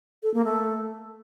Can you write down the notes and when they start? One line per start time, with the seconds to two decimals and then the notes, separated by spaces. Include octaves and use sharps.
0.23 A4
0.34 A#3
0.45 A3